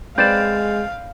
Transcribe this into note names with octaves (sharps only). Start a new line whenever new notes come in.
G#3 C4 B4 D5 F5 G6 A6 E7